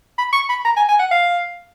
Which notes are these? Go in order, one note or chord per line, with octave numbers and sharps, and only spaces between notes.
B5
C#6
B5
A#5
G#5
G#5
F#5
F5